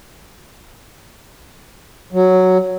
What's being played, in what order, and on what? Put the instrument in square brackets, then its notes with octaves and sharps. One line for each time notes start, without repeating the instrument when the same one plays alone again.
[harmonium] F#3